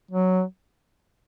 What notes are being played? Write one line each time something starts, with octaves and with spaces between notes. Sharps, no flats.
F#3